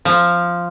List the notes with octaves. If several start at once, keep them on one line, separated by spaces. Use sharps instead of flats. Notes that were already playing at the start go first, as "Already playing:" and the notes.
F3